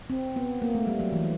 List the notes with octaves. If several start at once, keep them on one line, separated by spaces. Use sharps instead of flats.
C4
B3
A#3
A3
G3
F#3
E3